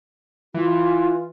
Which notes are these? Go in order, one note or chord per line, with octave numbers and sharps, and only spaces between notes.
E3 F4